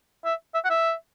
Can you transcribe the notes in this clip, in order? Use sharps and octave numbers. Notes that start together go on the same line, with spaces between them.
E5
E5
F#5
E5